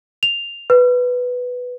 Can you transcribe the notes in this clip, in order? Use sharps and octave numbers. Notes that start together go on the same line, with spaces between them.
F7
B4